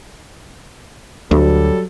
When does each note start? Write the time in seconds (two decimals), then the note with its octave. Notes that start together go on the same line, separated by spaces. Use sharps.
1.31 D2 F#3 G3 A4